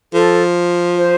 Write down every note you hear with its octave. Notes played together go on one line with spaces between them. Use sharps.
F3 A4
C5